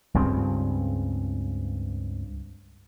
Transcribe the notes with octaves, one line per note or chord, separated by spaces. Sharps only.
C#2 G2 C#3 C4